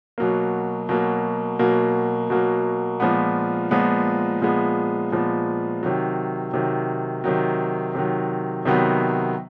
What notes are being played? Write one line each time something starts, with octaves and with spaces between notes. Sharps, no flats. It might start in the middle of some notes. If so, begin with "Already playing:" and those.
B2 F#3 A#3
B2 F#3 A#3
B2 F#3 A#3
B2 F#3 A#3
A#2 F3 G#3 B3
A#2 F3 G#3 B3
A#2 F3 G#3 B3
A#2 F3 G#3 B3
C3 D#3 F#3
C3 D#3 F#3
C3 D#3 F#3
C3 D#3 F#3
C3 D#3 F#3 B3